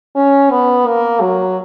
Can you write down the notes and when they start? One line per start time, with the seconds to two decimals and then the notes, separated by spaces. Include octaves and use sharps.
0.16 C#4
0.51 B3
0.86 A#3
1.21 F#3